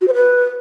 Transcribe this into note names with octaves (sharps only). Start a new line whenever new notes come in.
F#4
C5
B4